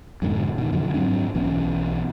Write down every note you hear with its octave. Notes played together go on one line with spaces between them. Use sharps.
F2 G#2 B2 D3
B2 D#3
F#2 D3 F3
G#2 F#3 C4 D4
B1 E3 B3 C#4